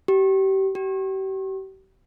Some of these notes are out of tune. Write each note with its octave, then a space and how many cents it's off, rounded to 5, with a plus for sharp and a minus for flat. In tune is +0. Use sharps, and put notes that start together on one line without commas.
G4 -30
G4 -40